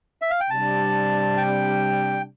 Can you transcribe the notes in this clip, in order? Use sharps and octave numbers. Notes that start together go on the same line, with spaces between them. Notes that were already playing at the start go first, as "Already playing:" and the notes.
E5
F5
G5
C3 G3 D4 A5
G5